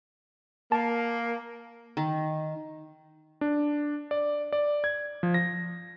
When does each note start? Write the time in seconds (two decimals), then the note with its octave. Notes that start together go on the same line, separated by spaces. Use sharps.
0.72 A#3 A5
1.97 D#3
3.41 D4
4.11 D5
4.53 D5
4.84 G#6
5.23 F3
5.34 A#6